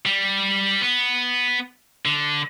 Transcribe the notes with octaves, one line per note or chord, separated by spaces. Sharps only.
G3
B3
D3